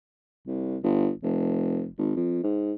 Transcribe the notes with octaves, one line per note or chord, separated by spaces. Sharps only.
C2
G1
F1
G#1
F2
G#2